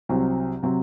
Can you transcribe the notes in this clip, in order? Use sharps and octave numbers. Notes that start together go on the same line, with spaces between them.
C2 C3 F#3 C4
C3 F#3 C4